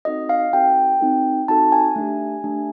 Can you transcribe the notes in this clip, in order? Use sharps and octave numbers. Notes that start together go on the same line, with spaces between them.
C4 D#4 F#4 A4 D#5
F5
C4 D#4 F#4 A4 G5
C4 D#4 F#4 A4
C4 D#4 F#4 A4 A5
G#5
A3 D4 G4
A3 D4 G4